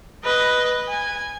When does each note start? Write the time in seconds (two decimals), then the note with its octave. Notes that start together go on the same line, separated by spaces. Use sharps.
0.24 B4 D#5
0.89 G#5